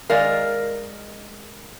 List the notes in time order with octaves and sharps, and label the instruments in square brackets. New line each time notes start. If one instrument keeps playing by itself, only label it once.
[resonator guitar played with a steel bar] D#3 G#3 A#4 [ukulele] D5 F5